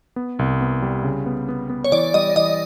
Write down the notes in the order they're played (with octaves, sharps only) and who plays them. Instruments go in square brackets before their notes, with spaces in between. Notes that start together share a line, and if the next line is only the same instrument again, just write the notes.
[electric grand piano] B3
C2
B3
G3
C#3
B3
B3
B3
[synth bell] C#5
[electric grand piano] E3 [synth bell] D5
[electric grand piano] G3 [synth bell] D#5
[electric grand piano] E3 [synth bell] D#5